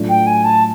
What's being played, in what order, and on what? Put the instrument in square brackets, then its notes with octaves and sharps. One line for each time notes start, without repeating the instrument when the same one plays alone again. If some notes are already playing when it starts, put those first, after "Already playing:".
Already playing: [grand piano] A2 F#3 A3 D4 F4
[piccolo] G5
G#5
A5